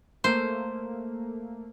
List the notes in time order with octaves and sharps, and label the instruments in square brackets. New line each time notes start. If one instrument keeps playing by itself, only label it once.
[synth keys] A3 A#3 [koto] C5